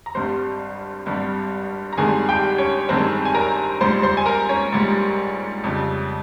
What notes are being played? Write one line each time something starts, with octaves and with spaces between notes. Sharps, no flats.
A#5
G#1 G2 G3 C5 C6
G#1 G2 G3
A#5
G#1 G2 D#3 G#3 G#4 G#5
G4 G5
C#4 C#5
G#1 G2 D#3 G#3 C4 C5
G#5
A#4 A#5
A#1 G#2 G3 C5 C6
C5 C6
G#5
A#4 A#5
C#4 C#5
A#1 G#2 G3
F2 C#3 G3